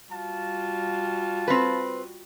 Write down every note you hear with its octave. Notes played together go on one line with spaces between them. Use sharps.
G3 F4 F#4 F5 A5
C4 B4